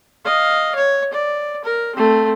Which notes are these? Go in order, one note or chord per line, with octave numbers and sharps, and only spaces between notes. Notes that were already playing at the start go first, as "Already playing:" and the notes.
D#5 F5
C#5
D5
A#4
A3 C4